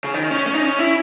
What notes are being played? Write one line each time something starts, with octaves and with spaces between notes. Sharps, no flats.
C#3
D#3
C#4
C#4
D#4
C#4
E4